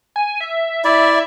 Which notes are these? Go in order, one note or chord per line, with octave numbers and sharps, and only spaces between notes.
G#5
E5
E4 D5